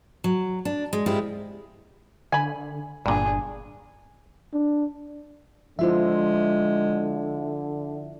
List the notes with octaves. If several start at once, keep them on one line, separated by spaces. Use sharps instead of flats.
F#3
D4
G#3
G#2 G#3 E4 F4 G4
D3 G#5 B5
G1 G2 A#2 D4 G#4
D4
D3 F3 G#3 E4 F4 C5 E5